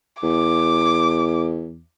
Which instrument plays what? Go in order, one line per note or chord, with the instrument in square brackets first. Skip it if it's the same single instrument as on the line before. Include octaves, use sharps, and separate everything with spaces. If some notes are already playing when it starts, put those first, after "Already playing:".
[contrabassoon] E2 [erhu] D6